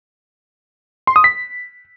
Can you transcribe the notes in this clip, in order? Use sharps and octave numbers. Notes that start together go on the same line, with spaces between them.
C6
D#6
B6